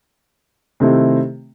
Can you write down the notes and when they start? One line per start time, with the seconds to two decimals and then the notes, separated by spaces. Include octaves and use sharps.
0.80 C3 D#3 A3 C4 E4